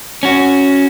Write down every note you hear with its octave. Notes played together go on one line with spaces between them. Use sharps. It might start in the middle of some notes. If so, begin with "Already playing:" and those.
C#4 F#4